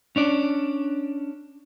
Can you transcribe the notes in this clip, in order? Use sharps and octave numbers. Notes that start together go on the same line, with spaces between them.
C#4 D4 D5